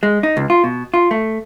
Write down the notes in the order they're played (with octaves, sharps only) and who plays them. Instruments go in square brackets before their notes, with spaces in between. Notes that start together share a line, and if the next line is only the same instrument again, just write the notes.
[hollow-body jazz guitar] G#3
D#4
C#2
F4
B2
F4
A3